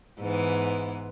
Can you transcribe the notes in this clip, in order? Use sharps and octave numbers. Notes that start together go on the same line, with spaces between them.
G#2 E3 B3